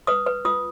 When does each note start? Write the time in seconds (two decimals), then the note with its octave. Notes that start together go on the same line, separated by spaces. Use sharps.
0.07 B4 D#6
0.26 B4
0.45 F4 D#6